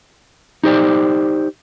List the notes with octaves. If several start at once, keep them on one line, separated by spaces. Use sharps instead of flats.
D#4 G4 C5 D5